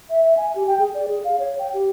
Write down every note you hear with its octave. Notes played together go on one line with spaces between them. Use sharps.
E5
E5
G#5
G4
G5
G#4
D5
G#4
F5
C#5
G5
G4